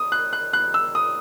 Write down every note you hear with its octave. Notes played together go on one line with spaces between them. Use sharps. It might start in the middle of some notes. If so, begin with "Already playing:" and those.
Already playing: D#6
F#6
F#6
F#6
E6
D#6